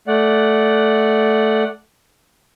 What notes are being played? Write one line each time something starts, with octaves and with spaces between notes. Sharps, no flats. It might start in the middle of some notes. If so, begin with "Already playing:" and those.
A3 D5 F#5